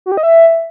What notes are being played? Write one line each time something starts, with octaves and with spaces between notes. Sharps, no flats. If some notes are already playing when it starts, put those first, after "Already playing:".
F#4
G4
D#5
E5